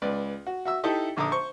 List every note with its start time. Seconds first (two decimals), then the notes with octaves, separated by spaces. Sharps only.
0.02 C#2 B4 D5
0.47 F#4
0.65 F#4 E5 E6
0.83 D#4 E4 G4 A4 D#5 E5
1.17 A#1 D3 A#5 D6 D#6
1.31 C5 C#6